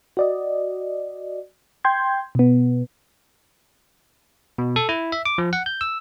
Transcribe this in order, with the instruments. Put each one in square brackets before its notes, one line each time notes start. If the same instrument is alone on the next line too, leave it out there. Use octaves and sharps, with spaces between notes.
[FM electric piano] F#4 D5 D#5
G5 C6 G6 G#6
B2 B3
[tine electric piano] B2
A4
E4
E5
D6
F3
F#5
G6
E6